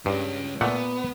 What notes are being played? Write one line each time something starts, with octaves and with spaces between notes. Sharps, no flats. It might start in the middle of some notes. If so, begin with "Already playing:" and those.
G2 G#3 C#4
A#2 A3 B3 F#5